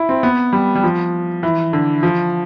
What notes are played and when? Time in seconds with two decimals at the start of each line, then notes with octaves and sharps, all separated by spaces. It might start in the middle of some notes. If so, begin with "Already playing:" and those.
Already playing: E4
0.09 C4
0.23 B3
0.53 G3
0.75 G3
0.84 F3
1.43 E3
1.73 D3
2.03 F3